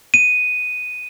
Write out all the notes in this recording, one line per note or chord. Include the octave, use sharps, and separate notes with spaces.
D#7